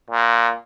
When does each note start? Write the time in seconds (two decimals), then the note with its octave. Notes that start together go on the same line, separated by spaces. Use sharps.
0.10 A#2